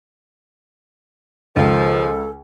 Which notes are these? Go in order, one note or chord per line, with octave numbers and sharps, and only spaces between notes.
C#2 D#3 F3 A4